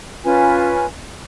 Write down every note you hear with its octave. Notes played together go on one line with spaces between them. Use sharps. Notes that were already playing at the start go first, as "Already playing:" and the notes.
C#4 F4 B4 G#5